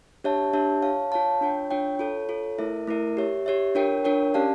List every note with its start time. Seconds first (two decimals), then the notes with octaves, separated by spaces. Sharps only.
0.24 D4 G4 C#5 E5 A5
0.53 D4 G4 C#5 E5 A5
0.82 F4 C#5 F5 A5
1.12 F4 C#5 F5 A5
1.41 D4 F4 C#5 G5
1.71 D4 F4 C#5 G5
1.99 F4 A4 C#5
2.29 F4 A4 C#5
2.58 A3 E4 A#4 E5
2.87 A3 E4 A#4 E5
3.17 G4 C#5 E5
3.46 G4 C#5 E5
3.75 D4 F4 A#4 C#5 G5
4.05 D4 F4 A#4 C#5 G5
4.34 C#4 G4 D5 F5 A5